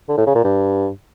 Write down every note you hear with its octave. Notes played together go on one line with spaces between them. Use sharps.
D3
A2
C#3
A#2
G2